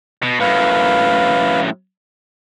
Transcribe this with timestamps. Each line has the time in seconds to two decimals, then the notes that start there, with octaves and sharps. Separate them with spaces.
0.23 B2
0.40 F#2 A2 B4 F5